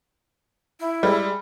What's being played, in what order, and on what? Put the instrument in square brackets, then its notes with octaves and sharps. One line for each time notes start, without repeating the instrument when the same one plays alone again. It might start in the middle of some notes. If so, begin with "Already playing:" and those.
[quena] E4
[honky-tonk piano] G3 G#3